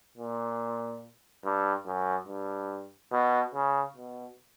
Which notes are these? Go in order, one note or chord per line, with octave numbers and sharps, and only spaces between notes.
A#2
G2
F#2
G2
B2
C#3
B2